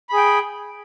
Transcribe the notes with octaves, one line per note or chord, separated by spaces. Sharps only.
G#4 G5 B5